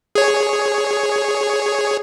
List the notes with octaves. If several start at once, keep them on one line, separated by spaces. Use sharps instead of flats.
G#4 C#5